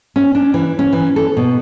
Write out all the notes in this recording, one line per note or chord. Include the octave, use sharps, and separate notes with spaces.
C#4
D4
E3
C#4
E3
A4
B2